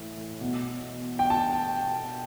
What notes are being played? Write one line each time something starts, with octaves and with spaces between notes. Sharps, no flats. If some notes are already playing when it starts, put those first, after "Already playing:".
Already playing: A2 E3
B2
G5
A5